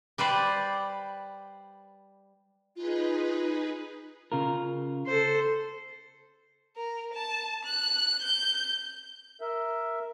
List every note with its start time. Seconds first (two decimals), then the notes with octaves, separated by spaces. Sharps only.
0.18 G3 B4 C5 D5
2.76 D#4 F4 G#4 B4
4.32 C#3 F4 A#4
5.07 A4 C5
6.76 A#4
7.14 A5
7.65 F#6
8.22 G6
9.41 A#4 E5